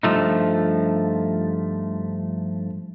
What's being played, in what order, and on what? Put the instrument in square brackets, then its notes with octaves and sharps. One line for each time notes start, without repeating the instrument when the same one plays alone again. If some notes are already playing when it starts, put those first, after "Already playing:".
[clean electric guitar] G2 F3 A3 D#4